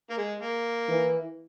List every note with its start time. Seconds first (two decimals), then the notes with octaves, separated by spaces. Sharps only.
0.10 A#3
0.17 G#3
0.41 A#3
0.89 E3